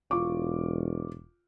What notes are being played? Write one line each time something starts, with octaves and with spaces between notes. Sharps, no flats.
E1 F4 C#6 D6